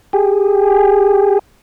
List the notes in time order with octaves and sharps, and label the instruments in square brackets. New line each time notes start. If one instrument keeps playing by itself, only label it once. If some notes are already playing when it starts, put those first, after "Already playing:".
[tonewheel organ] G4 G#4